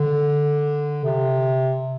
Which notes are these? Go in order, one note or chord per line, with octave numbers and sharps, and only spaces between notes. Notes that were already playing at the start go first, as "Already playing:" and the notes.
Already playing: D3
C3